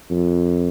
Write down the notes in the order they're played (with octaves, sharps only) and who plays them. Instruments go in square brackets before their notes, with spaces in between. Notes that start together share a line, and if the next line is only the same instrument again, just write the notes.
[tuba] F2